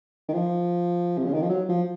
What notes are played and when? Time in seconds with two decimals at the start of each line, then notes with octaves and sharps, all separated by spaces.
0.29 D#3
0.33 F3
1.18 C3
1.26 C#3
1.34 D#3
1.42 F3
1.49 F#3
1.69 F3